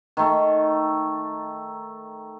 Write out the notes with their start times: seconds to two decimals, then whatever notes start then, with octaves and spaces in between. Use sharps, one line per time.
0.17 D#3 A3